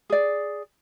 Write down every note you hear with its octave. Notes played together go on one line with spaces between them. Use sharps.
G#4 D5